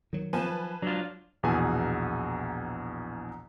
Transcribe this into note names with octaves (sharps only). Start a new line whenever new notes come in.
D#3 F#3
F3 B4 G#5 A5
F#3 D4 F4
A#1 E2 B2 G#4 G#5 A5